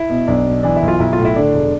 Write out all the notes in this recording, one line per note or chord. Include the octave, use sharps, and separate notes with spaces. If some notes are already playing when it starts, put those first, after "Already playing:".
Already playing: E4
B2
B1 D4
B2
E3 D4
E4
B1
F4
B1 E4
F4
A2
E4
D3 D4
E1